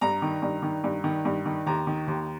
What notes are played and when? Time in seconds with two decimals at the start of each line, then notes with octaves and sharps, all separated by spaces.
0.01 G2 A#5
0.22 D#3
0.42 G2
0.62 D#3
0.84 G2
1.04 D#3
1.25 G2
1.45 D#3
1.67 D#2 A#5
1.87 D#3
2.08 D#2